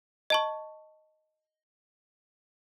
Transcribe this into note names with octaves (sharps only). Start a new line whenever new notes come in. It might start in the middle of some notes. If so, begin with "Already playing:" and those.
D#5 A5 C#6